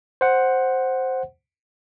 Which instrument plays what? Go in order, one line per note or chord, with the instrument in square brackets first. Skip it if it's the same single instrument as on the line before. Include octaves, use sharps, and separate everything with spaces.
[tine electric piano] C5 F#5